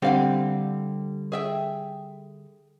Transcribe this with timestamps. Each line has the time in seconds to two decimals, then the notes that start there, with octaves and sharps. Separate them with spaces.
0.02 D3 G3 C4 G4 F5 F#5
1.32 G#4 E5 G5